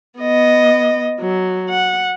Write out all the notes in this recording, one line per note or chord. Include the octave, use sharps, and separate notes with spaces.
B3 D#5
F#3
F#5